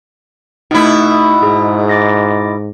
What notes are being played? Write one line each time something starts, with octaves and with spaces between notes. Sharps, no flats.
B2 A3 D#4 E4
G#2 G#4
D6 A6 A#6